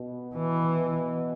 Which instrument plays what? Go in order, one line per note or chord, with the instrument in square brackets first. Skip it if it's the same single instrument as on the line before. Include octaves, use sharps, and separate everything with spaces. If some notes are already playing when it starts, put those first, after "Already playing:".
Already playing: [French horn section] B2
[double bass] E3